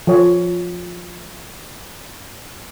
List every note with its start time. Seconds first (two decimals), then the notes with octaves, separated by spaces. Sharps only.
0.07 F3 C#5